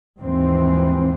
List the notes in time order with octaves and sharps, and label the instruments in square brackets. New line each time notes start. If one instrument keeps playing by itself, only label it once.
[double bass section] D#2 G#2 E3 F3 C4